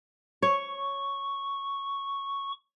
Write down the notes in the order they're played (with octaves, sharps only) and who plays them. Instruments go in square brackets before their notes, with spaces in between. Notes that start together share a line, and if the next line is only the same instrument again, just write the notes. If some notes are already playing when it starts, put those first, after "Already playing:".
[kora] C#5 [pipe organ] C#6